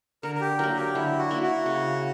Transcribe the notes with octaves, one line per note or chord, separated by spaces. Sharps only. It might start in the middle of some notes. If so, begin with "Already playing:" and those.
D3 A#4
A#4
G4
F#3 A#3 A#4
G4
D3 E4
F#4
A#3 E4
F#4
C#3